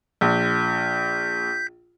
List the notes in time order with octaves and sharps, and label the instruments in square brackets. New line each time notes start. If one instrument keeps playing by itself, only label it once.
[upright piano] A#1 [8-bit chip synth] G6 B6